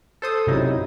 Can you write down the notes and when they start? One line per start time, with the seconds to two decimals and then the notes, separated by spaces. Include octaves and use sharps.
0.22 A4 C5 D#6
0.47 F#2 C3 F#3 D#4 E4